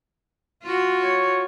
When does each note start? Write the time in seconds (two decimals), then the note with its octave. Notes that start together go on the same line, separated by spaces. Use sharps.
0.63 F4 F#4
1.03 C#5